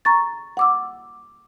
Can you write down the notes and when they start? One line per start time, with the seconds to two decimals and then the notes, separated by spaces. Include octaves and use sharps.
0.05 A#5 C#6 A6
0.57 F#5 D6 E6